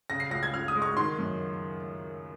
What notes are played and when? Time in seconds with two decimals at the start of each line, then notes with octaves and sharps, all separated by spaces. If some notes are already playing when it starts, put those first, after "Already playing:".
0.10 C#3 A#6
0.20 C7
0.31 C#2 A#6
0.43 G#6
0.53 C#2 F6
0.68 D#6
0.75 G#3
0.82 C#6
0.97 D#3 C6
1.19 F#2